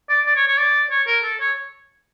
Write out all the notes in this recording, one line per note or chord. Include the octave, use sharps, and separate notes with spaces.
D5
D5
C#5
C#5
D5
C#5
A#4
A4
C#5